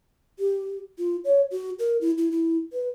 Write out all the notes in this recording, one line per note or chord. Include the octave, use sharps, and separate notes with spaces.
G4
F4
C#5
F#4
A#4
E4
E4
E4
B4